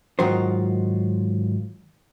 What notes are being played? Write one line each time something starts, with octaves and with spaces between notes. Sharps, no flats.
G#2 D#3 F#3 F4 A#4 C5